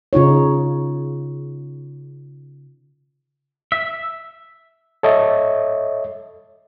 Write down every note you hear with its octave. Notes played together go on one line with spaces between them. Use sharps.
C#3 D#4 F4 C#5
E5
A4 C#5 D#5 E5